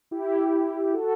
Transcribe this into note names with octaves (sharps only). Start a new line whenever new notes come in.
E4 G4
F#4 A4